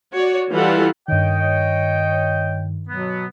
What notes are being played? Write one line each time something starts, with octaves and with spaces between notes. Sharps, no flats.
F#4 C#5 D5
E3 G3 F4 A4 F#5
G2 D#3 C#5 D#5 G5
B2 F#3 B3